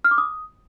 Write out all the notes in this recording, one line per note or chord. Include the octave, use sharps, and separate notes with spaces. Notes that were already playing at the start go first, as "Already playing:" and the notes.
F6
D6
D#6